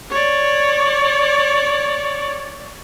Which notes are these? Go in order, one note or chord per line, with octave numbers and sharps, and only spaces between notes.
C#5 D5